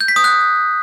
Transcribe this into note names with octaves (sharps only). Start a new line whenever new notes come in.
G6
B6
D#6
F#6